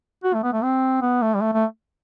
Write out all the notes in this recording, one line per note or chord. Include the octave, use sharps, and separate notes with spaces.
F#4
A3
B3
A3
C4
B3
A3
G3
A3
A3